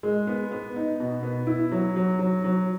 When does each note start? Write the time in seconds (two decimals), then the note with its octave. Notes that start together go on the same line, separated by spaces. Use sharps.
0.03 G#3
0.27 B3
0.52 B3
0.76 D#4
1.00 B2
1.23 B3
1.47 E4
1.72 F#3
1.96 F#3
2.19 F#3
2.44 F#3